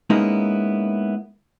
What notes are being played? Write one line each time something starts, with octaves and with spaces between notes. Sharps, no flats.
G#3 A#3 B3 C#4 D#4 E4